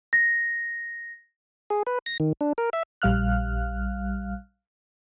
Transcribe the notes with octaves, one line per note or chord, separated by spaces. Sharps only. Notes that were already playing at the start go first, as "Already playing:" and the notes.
A#6
G#4
B4
A#6
D#3
D4
A#4
E5
A#1 G3 F5 F6 F#6